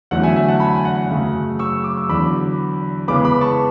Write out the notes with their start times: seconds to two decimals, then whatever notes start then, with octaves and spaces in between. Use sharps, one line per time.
0.11 E2 D3 F#3 A3 F#5
0.23 E5 G#5
0.36 E5 G#5
0.48 F#5 A5
0.60 G#5 B5
0.75 G#5
0.85 F#5
1.10 F#2 C#3 F#3 A3
1.59 C#6 E6
1.84 D6
1.97 E6
2.09 E2 D3 F#3 B5 D6
3.08 C#3 E3 G#3 B3 B5 D6
3.25 B5 D6
3.41 A5 C#6